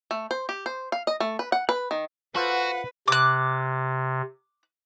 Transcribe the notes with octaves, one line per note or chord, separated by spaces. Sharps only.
A3
C5
G4
C5
F5
D#5
A3
B4
F#5
B4
D#3
F4 F#4 A4 B4 C5 F#5
C3 D6 F#6